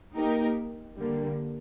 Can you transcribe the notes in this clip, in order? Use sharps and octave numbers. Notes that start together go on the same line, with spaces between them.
A#3 D#4 G4 A#4
D3 G3 A#3